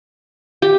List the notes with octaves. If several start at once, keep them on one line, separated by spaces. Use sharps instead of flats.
G4